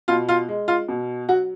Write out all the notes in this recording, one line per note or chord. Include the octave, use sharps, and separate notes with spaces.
B2 F4
F4
G#3
F4
B2
F#3 F#4